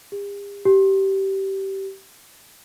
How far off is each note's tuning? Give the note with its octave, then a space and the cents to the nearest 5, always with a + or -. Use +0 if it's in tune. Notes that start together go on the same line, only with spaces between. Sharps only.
G4 +45
G4 -20